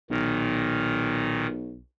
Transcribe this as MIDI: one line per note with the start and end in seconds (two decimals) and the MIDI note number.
0.10 1.82 35
0.10 1.47 46
0.10 1.47 51